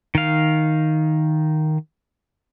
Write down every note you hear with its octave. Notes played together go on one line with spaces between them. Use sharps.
D#3 F5